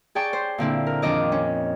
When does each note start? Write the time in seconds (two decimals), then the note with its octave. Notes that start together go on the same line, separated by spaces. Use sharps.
0.15 G#4 D5 G5 A5 C#6
0.33 C5
0.58 A#2 D3 C4 E4
0.87 A#4
1.02 F2 D#3 D4 D#5 D6
1.32 C#4